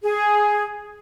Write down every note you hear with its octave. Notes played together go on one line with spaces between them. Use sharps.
G#4